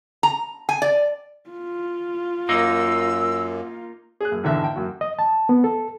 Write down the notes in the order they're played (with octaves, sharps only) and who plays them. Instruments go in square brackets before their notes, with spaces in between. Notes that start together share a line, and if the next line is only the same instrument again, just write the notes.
[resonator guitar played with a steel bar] A#5
G#5
D5
[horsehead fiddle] F4
[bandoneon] F#2 [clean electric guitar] A#3 D#4 [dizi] E6
[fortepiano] G#4 F#6
F#2
G#1 E2 D3 A4 E5 F#6
G5
F#2 F#4
[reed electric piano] D#5
A5
B3
A4